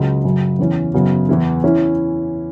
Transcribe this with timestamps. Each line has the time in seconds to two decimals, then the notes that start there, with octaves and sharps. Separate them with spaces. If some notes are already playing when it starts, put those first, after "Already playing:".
Already playing: C#2 C#3 F#3
0.24 F#2 C#3 F#3
0.59 E2 E3 C#4
0.94 F#2 C#3 F#3 B3
1.29 E2 E3 B3 E4
1.64 E3 C#4 E4